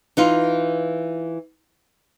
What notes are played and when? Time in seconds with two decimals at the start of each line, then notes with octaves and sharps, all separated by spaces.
0.17 E3 D#4 F4